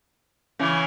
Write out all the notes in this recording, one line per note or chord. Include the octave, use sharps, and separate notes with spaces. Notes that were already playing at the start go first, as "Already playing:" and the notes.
C#3 E3